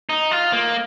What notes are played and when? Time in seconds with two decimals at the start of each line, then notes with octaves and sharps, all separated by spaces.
0.09 D#4
0.31 F4
0.53 A#3